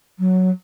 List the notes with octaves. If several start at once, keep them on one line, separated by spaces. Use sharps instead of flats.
F#3